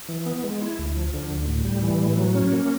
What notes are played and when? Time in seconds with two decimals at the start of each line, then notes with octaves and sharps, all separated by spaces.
0.09 E3
0.26 B3
0.44 G#3
0.61 E4
0.78 D2
0.95 F3
1.14 D3
1.31 D2
1.48 A2
1.65 G3
1.83 E3
2.00 A2
2.17 F#3
2.35 C#4
2.52 A#3